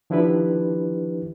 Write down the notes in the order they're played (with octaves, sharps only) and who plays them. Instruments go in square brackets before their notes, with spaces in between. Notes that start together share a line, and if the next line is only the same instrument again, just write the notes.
[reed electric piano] D#3 F3 D4 E4 G4 B4